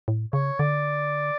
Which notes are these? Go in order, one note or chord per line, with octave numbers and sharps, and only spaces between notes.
A2
C#3 C#5
D3 D5